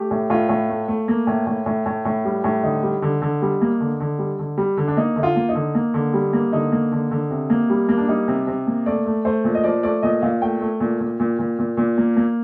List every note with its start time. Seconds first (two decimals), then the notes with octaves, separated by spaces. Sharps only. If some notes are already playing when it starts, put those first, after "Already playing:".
Already playing: A3 G4
0.11 A2
0.30 A2 F4
0.49 A2
0.69 A3
0.88 A3
1.08 A#3
1.27 A2
1.47 A2
1.66 A2
1.86 A2
2.05 A2
2.25 G3
2.44 A2
2.63 D3 D#4
2.83 G3
3.02 D3
3.22 D3
3.42 G3
3.61 A#3
3.80 D3
4.00 D3
4.19 G3
4.39 D3
4.58 G3
4.77 D3
4.88 D4
4.97 A#3 D#4
5.16 D3 D#4
5.23 F4
5.36 A#3
5.49 D#4
5.55 D3
5.75 A#3
5.94 D3
6.14 G3
6.33 A#3
6.52 D3 D#4
6.72 A#3
6.92 D3
7.11 D3
7.30 C3
7.50 A#3
7.70 G3
7.89 A#3
7.97 D4
8.08 G3 D#4
8.28 C3
8.47 C3
8.67 A#3
8.86 A3 D5
9.06 A3
9.25 A3 C5
9.44 A#2
9.55 D#5
9.64 F3 D5
9.83 A3 D5
10.02 A#2 D#5
10.22 A#2 F5
10.41 A3 G5
10.61 A3
10.80 A#2
11.00 A#2
11.20 A#2
11.39 A#2
11.59 A#2
11.77 A#2
11.98 A#3
12.17 A#3